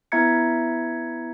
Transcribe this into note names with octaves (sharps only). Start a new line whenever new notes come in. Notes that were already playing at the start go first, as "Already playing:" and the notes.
B3 E4 E5 A#5 G#6 C#7